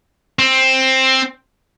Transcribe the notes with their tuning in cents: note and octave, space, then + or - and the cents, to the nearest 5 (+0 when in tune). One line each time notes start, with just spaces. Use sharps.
C4 +10